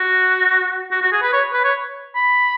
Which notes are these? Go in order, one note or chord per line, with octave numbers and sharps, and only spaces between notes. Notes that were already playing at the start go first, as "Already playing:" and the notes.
Already playing: F#4
F#4
F#4
G#4
B4
C#5
B4
C#5
B5